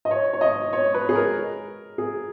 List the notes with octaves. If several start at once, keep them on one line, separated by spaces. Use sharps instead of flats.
D#5
C#5
C#5
D#5
C#5
B4
G#4
A#4
G#4